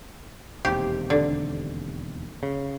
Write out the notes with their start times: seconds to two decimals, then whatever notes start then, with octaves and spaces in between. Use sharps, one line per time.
0.65 E1 D#2 C3 G4
1.10 D3
2.43 C#3